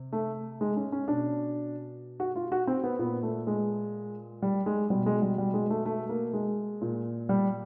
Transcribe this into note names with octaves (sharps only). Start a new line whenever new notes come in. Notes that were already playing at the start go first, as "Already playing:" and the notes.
Already playing: C3
A3
G#3
C#4
C#4
B2 D4
F#4
F4
F#4
C4
B3
A#2 B3
A3
G#3
G3
G#3
B2 G3
G#3
G3
G3
G#3
A3
A3
A#3
G#3
A#2
G3